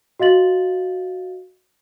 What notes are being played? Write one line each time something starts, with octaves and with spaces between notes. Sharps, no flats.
F#4 D#5 F5 A6 F#7